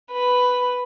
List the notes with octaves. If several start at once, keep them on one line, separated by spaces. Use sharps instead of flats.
B4